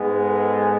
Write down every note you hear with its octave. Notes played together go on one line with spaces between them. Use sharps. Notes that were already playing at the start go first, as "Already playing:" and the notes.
Already playing: G#2 G#3 B3
A4